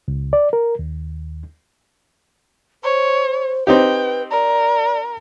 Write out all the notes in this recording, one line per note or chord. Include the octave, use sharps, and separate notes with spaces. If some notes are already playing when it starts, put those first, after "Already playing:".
C#2
D5
A#4
D#2
C5 C#5
C4 D#4 G4 B4 G5
A#4 D5